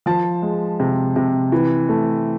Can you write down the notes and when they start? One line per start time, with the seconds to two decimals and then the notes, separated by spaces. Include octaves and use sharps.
0.06 F3 A5
0.42 G#3
0.80 C3
1.16 C3
1.52 E3
1.89 A3